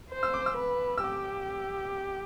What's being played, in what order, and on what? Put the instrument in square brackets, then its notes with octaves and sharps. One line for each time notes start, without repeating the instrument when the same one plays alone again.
[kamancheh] C5
[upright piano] E6
D6
E6
[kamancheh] B4
[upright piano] E6
[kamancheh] G4 [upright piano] D6